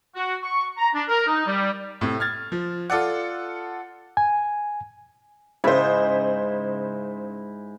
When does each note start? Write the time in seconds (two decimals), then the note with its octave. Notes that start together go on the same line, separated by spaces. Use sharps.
0.15 F#4
0.42 C#6
0.77 A#5
0.94 D4
1.08 A#4
1.26 D#4
1.46 G3
2.01 A2 C3
2.20 F6 G#6 A6
2.52 F3
2.90 F4 A4 D5 F#5
4.17 G#5
5.64 G#2 C#3 E4 C5 B5